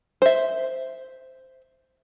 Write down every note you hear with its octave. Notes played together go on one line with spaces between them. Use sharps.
C5 E5